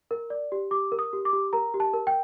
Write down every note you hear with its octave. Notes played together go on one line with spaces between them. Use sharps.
A#4
D5
G4
G4 D6
A#4
D#6
G4
D6
G4
A#4 A#5
G4
A5
A#4
G5